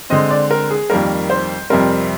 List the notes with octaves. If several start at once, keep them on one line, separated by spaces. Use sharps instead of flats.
D3 G#3 C4 D#5
D5
A#4
G#4
F2 D#3 G3 A#3 A#4
C5
F2 C3 G3 C4 A#4